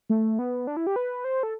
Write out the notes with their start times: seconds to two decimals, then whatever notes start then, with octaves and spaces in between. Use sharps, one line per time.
0.10 A3
0.39 B3
0.67 D4
0.77 E4
0.87 G4
0.96 B4
1.24 C5
1.43 A4